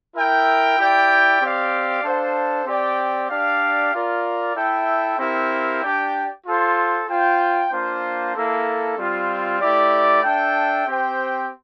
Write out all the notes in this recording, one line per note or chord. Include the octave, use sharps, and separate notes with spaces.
E4 A#4 E5 G5
E4 G4 D5 G5
C4 G4 D5 F5
D4 A4 C5 F5
C4 G4 D5 G5
D4 G4 D5 F5
F4 A#4 D5
E4 A4 E5 G5
C4 E4 G4 A#4 F5
D4 G4 D5 G5
F4 A4 C5
F4 C5 G5
A#3 D4 F4 C5
A#3 E4 A4
G3 C4 F4
A3 E4 G4 D5
D4 A4 E5 G5
C4 G4 C5 G5